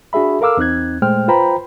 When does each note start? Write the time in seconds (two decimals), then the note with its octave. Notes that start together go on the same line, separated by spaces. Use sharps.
0.13 D4 F#4 G#4 E5 B5
0.41 A4 A#4 F5 D6 E6 F6
0.57 E2 C4 D#4 F#6 G#6
1.02 A#2 G#3 A3 C5 G5 F6
1.28 F4 B4 C5 G5 A#5 B5